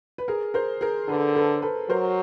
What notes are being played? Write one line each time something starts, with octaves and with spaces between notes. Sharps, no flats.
B4
G#4 A#4
A#4 C5
G#4 A#4
D3 A4 B4
A4 B4
A4 B4
F#3 A#4 C5